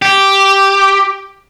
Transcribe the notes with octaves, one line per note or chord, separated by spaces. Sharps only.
G4